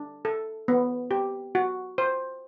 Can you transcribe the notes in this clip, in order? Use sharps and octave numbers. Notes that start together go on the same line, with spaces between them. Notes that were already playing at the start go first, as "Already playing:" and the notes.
Already playing: D4
A4
B3
G4
F#4
C5